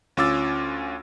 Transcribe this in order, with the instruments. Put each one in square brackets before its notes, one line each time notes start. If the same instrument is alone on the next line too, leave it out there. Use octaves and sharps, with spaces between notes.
[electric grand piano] D2 C#4 F4 D6 E6 A6